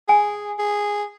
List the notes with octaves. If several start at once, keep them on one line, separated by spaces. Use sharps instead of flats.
G#4 G#5
G#4